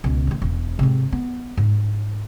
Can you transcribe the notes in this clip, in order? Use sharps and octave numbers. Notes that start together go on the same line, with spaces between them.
C#2 B2
D#3 A3
E1
G#2 C3
B3
G#2